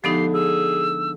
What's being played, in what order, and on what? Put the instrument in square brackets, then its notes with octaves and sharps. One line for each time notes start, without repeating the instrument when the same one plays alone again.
[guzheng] D3 G#3 A3 [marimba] F3 B3 D#4 [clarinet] G4 [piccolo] C7
[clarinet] G#4 [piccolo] E6